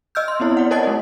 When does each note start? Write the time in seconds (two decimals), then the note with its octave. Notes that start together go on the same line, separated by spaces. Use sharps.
0.15 D#5 E6 F6 G6
0.28 C6
0.40 B3 C4 E4 C#5
0.57 D5 F#5
0.71 A#4 C#5 D#5 A5 A6
0.83 A3 E4 D#5